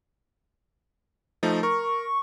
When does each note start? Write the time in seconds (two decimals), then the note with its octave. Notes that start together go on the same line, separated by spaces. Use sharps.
1.43 F3 A3 D#4
1.63 A#4 C#6